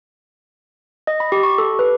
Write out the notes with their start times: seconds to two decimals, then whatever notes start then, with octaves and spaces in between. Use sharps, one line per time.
1.07 D#5
1.20 B5
1.32 G4
1.43 C#6
1.58 A4
1.79 B4